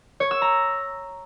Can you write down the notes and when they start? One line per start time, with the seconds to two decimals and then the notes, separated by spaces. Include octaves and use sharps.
0.20 C#5
0.31 E6
0.42 A#5